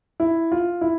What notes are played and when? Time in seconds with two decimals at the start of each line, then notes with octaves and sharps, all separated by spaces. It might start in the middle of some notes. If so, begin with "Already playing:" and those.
0.20 E4
0.52 F4
0.81 E4